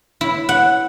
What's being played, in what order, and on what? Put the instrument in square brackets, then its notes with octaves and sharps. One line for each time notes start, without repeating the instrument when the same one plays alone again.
[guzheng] E4
F#5